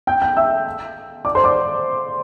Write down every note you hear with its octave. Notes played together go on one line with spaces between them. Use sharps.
G5 G6
G5 G6
E5 E6
D5 D6
C5 C6
D5 D6